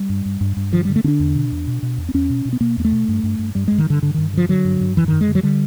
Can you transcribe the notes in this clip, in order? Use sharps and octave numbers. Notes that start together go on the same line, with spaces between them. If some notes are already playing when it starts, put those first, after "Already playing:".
Already playing: G3
G2
G2
G2
G2
D3 F3
D3 G3
A3
D3 C#4 D4
E2
B2
E2
B2
B2
E2
C4
E2 C#4
B2
B2
B3
B2 A#3
E2 A#3
A3
B2
G2
G2
G2
G2 G3
G2 G#3
D#3
G2 D3
G2 D3
G2 D#3
D3 F3
D3 F#3
G2
G2
F#2 E3
F#2 D#3
G#3
D3
F#3
D3 G3